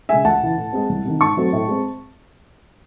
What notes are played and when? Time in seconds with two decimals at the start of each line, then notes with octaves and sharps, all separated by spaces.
0.09 C#3 G#3 E5 G#5
0.25 C#2 F#5 A5
0.42 C#3 E3
0.57 A2
0.73 G#3 C4
0.89 C2
1.04 C3 D#3
1.20 G#2 A5 C#6
1.37 F#3 A3 C4
1.53 A2
1.68 G#3 C4